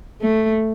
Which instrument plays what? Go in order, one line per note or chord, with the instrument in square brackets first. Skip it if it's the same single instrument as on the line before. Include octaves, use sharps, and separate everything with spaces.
[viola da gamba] A3